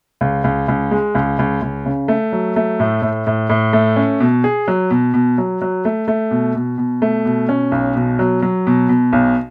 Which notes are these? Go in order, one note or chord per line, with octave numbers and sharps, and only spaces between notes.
C#2
C#2
C#2
G#3
C#2
C#2
C#2
C#3
A3
F#3
A3
A2
A2
A2
A2
A3
C#4
B2
G#4
F#3
B2
B2
F#3
F#3
A3
A3
B2
B2
B2
A3
B2
C#4
B1
B2
F#3
F#3
B2
B2
B1